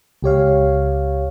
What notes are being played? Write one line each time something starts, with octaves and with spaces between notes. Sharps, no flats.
C#2 G4 C#5 F5